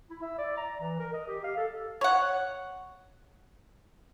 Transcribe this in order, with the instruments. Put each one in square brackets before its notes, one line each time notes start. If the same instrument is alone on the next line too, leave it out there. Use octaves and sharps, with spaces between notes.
[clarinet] E4
E5
D5
A#5
E3
A#4
D#5
G4
F5
A4
[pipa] C#5 F#5